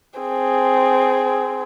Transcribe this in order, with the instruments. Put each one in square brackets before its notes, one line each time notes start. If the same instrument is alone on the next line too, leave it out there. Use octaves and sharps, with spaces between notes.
[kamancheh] C4 G#4